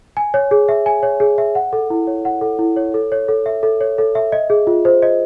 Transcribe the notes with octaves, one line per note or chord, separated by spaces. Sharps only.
G#5
C#5
G#4
E5
G#5
C#5
G#4
E5
F#5
A4
E4
C#5
F#5
A4
E4
C#5
A4
C#5
A4
E5
A4
C#5
A4
E5
D#5
G#4
F4
C5
D#5